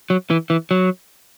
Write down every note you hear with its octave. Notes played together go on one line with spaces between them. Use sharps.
F#3
E3
E3
F#3